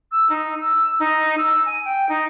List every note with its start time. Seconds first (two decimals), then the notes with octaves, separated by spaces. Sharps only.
0.12 E6
0.30 D#4
0.60 E6
0.99 D#4
1.38 E6
1.66 G#5
1.85 G5
2.09 D#4